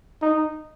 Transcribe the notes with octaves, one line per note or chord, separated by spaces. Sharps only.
D#4